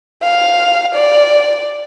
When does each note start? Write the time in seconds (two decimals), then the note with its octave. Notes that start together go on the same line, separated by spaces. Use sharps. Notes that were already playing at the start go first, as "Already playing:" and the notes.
0.23 F5
0.95 D5